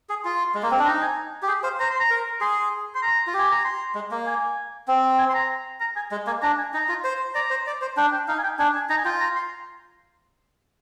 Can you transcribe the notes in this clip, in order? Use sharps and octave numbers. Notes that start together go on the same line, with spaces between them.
G#4
F4 C6
G#3
A#3
C4
D4
D#4 A#5
G#5
G4
G#4 G5
C5 F5
C5 A#5
C6
A#5
A#4
G#4 C6
C6
A#5
F4
G4 G#5
A#5
C6
G#3
A#3
G#5
C4
G#5
C6
A#5
A#5
G#5
G#3
A#3 G#5
D4 A#5
G#5
D#4 A#5
F4
C5
D5 A#5
C5
D5
C5
D4 G5
G5
D#4 F5
G#5
G5
D4 G#5
G#5
D#4 A#5
G#5
F4 G5
A#5
C6